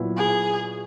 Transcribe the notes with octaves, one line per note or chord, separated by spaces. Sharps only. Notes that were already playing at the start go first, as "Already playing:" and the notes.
Already playing: A#2 F#3 B3 E4
G#4